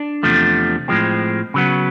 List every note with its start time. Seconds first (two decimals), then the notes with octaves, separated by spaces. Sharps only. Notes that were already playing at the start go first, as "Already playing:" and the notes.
Already playing: D4
0.23 E2 C3 F3 A3
0.88 A2 F3 G#3 C4
1.54 C#3 F#3 B3